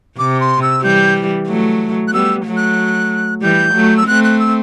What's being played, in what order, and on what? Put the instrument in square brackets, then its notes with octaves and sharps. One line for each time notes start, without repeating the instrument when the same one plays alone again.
[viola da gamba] C3 [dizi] D6
[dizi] C6
E6
[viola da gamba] E3 G3 [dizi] G6
[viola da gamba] F#3 A3
[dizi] F#6
[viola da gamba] G3 B3 [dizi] E6
[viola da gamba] F#3 A3
[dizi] F#6
[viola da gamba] E3 G3 [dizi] G6
[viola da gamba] F#3 A3
[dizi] E6
[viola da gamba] A3 C4 [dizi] F#6
[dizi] F#6
E6